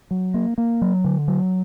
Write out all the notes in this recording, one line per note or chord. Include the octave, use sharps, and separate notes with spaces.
F#3
A#3
A#3
F#3
D3
F#3